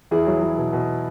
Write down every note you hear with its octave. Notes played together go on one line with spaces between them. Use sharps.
E2 E4 G#4
F#3
F#3
B2
B2